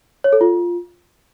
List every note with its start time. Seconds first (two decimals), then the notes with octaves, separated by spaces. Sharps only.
0.24 C#5
0.33 A4
0.41 F4